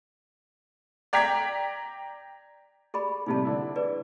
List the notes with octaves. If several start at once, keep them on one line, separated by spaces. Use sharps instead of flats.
D5 G5 A#5 G#6 B6
G4 G#4 D5 B5
A2 C3 G3 D#4 A5
D3 D4 E4
G#4 B4 D5